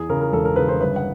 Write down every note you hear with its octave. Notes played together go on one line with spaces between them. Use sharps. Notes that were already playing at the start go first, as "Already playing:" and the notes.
Already playing: E2 G#4
C#3 A#4
A#4
E1 A4
A#4
C#3 B4
C5
G1 B4
F#5